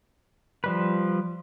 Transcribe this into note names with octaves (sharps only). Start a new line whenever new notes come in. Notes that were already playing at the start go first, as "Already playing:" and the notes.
F3 G3 B4